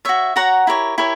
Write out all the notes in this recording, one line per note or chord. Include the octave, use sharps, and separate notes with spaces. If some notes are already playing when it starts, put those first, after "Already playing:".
F#4 C#5 E5
F#4 C#5 F#5 A#5
E4 G4 A#4 C#5
E4 G4 A#4 C#5